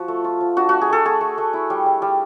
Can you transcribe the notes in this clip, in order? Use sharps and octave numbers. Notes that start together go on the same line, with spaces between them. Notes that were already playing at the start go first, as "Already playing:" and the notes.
Already playing: F3 F#4
A3
F4
F3
D4 F#4
A3 F#4
G#4
A3 A4
A3 G#4
A3
A3
E4
G3
G3
G3